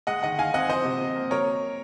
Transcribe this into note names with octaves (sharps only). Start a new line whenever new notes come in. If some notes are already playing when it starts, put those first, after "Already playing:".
G#3 D#5 F#5
D#3 D#5 F#5
D#3 F5 G#5
C4 D#5 F#5
F3 C5 D#5
C3
C3
A#3
F#3 A#4 C#5